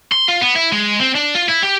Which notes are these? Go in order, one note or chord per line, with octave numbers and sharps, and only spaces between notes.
C6
F4
B3
E4
G#3
C4
D4
F4
E4
G4